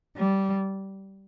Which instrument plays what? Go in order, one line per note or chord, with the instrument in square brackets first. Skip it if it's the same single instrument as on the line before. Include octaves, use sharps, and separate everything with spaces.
[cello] G3